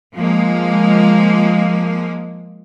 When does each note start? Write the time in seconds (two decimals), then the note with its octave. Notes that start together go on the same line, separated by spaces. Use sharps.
0.15 F3 G#3 A#3